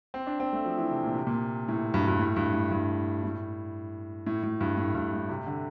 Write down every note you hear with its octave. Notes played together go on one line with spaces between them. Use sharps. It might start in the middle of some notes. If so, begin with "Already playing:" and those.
C4
D4
C4
A3
F3
E3
C3
A#2
C3
A#2
A2
G2
G2
A2
G2
A2
G2
A2
A2
A2
G2
A2
G2
A2
C3
D3